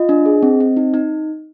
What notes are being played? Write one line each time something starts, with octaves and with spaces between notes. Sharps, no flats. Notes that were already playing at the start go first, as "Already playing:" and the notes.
Already playing: F4 D#5
D4
G#4
C4
C4
D#4
D#4